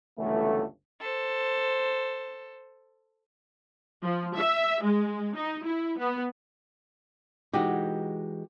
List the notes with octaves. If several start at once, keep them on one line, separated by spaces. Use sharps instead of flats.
G1 C#2 E3 F#3 A3
A4 C5
F3
E5
G#3
D#4
E4
B3
E3 G#3 D#4 F#4 G4